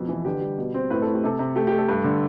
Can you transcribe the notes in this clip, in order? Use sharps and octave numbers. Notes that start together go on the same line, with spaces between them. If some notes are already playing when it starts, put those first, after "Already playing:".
Already playing: F2 B2
E3
D3 G4 B4
G3
B2
C4
A2 B4
A2 A4
G4
C3 A4
C3
A3 G4
G4
A3
A4
G2
D3